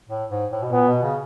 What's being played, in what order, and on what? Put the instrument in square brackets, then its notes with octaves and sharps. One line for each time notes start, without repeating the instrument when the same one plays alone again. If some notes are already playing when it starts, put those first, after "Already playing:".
[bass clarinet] A2
G#2
A2
B2
[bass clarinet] A#2 [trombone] B3
[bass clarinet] B2
C#3